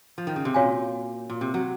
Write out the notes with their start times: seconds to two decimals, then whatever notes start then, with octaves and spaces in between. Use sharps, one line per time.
0.18 F3
0.27 D#3
0.36 C#3
0.45 C3
0.54 A#2 F#4 C#5 F5 G#5
1.30 A#2
1.41 C3
1.54 F#3